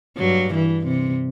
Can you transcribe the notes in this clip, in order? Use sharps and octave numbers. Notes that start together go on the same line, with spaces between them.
G2 F#3
E3
C3